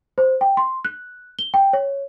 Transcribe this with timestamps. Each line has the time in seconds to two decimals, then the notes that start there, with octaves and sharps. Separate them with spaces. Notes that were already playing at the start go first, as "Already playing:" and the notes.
0.18 C5
0.41 G5
0.57 C6
0.85 F#6
1.39 G7
1.54 G5
1.73 C#5